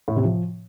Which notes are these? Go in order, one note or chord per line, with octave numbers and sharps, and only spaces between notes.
A2
C3
F3